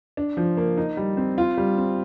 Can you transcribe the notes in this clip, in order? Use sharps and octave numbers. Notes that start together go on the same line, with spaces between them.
D4
F3
A#3
D#4
G3
C4
F4
G3
C4